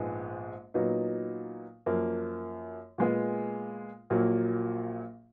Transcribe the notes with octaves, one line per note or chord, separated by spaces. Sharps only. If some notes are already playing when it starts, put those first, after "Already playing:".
Already playing: A#1 G#2 F3 G#3 B3
A#2 F#3 B3 D#4
F#2 F3 A#3
A#2 G#3 B3 F4 G#4
A#1 A#2 F#3 A#3